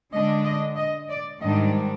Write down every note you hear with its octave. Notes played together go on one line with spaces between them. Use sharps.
D3 G#3 D4 D#5
D#5
D#5
D5
G#2 D#3 G3 D4 D#5